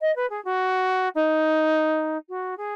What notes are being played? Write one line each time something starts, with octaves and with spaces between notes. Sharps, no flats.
D#5
B4
G#4
F#4
D#4
F#4
G#4